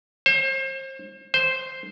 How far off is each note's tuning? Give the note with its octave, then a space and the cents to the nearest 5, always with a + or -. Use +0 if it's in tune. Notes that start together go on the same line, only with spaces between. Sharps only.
C5 +35
C5 +0